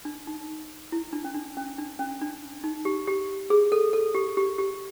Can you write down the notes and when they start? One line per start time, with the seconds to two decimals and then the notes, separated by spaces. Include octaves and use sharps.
0.05 D4
0.27 D#4
0.92 E4
1.13 D4
1.24 C#4
1.34 D4
1.57 C#4
1.78 D4
1.99 C#4
2.21 D4
2.64 D#4
2.85 G4
3.08 G4
3.50 G#4
3.72 A4
3.93 A4
4.15 G4
4.37 G4
4.58 G4